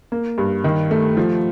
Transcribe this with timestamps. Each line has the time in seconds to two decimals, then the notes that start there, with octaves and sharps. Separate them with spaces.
0.12 A#3
0.38 G2
0.64 D#3
0.91 A3
1.17 F3